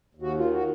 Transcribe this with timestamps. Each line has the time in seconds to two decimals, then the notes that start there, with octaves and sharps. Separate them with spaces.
0.15 D#2
0.22 F#4
0.38 D#3 F4
0.53 F#4